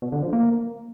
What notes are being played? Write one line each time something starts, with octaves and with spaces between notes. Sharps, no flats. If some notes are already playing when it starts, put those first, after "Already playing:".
B2
D3
F3
A#3